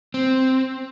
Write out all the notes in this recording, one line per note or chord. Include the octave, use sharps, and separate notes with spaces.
C4